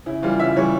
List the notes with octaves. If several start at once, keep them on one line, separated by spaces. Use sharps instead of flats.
C#3 E4
E3 G3 F4
C#3 E5
E3 G3 C#5